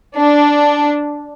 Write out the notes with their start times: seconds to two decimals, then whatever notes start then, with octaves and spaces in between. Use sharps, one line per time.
0.17 D4